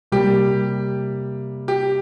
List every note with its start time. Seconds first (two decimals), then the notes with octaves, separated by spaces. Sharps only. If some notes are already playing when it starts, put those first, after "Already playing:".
0.12 C3 G3 A#3 G4
1.68 G4